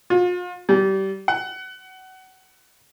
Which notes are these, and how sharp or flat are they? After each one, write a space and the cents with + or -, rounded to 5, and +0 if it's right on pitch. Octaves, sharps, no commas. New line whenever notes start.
F4 +40
G3 -25
F#5 +25